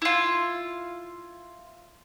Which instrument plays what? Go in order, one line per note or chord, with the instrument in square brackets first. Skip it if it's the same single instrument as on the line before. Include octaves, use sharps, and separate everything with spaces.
[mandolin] E4 F4